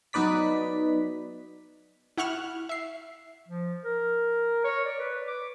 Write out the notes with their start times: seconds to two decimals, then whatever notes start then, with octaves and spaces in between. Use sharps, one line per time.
0.13 F#3 B3 D#4 B4 D5 B6
2.18 E4 F#5 C#6 F6 F#6 E7
2.69 E5 C7
3.49 F3
3.85 A#4
4.64 C#5
4.86 D5
5.00 B4
5.28 D6